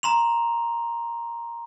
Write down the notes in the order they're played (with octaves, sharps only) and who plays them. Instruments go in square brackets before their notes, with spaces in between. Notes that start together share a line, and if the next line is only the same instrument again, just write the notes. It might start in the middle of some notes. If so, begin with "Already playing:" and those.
[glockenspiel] A#5 C6 F7